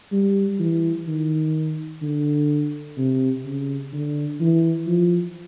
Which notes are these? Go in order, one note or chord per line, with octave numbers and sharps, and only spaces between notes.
G3
E3
D#3
D3
C3
C#3
D3
E3
F3